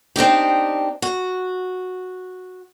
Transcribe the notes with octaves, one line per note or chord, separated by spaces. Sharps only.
C4 D4 D#4 G4
F#4